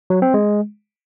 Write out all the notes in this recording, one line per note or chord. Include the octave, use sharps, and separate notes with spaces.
F#3
C4
G#3